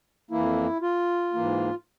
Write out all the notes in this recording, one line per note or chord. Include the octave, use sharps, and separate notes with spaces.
F2 E3 A#3 E4
F4
G#2 E3 A#3